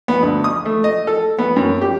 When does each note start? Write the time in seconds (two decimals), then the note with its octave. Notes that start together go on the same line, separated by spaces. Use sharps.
0.08 B3
0.23 D2
0.44 D#6
0.66 A3
0.84 D#5
1.07 A4
1.38 B3
1.56 F#2
1.81 G4